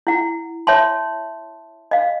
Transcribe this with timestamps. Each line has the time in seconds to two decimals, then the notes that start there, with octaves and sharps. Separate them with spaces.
0.07 E4 F#5
0.67 C#5 E5 A5 C6
1.91 D#5 F5